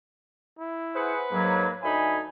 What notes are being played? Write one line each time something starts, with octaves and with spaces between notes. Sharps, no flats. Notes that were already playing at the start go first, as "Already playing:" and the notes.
E4
G#4 B4 C5 F#5
G#2 F#3 A#3
D2 D#4 E5 G#5 B5